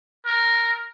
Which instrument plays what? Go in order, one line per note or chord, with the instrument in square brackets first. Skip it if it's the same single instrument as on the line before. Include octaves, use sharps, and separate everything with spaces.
[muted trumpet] A#4